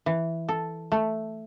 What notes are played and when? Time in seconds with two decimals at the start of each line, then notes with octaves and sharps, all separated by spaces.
0.06 E3
0.49 A4
0.92 A3